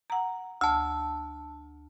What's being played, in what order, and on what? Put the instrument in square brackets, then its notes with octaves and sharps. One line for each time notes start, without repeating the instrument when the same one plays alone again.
[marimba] F#5 A#5
[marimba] D2 [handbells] A5 E6